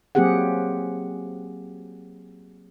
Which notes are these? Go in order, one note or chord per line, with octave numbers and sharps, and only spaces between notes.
F#3 A#3 C4 G4 G#4 F#5